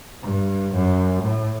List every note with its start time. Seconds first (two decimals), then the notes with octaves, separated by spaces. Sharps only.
0.22 G2
0.74 F#2
1.23 A2